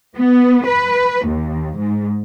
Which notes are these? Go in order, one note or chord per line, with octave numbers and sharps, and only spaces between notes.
B3
B4
D#2
G#2